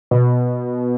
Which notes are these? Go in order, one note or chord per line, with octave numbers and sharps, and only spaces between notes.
B2